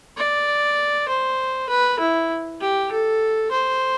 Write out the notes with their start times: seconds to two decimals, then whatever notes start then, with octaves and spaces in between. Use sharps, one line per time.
0.17 D5
1.08 C5
1.69 B4
2.00 E4
2.61 G4
2.91 A4
3.51 C5